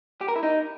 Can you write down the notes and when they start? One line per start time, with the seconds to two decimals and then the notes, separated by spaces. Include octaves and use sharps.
0.21 G4
0.28 A#4
0.36 E4
0.43 D#4